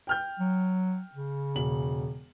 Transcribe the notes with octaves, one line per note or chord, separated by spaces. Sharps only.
G5 F6 G6
F#3
C#3
E1 F#7